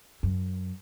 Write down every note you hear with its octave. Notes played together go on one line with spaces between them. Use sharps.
F#2